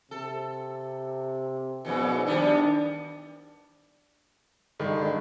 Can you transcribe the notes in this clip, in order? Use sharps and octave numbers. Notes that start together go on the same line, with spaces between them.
C3 A4
F2 G#2 B2 E3
D#3 G3 B3 D4
G2 D3 D#3 G#3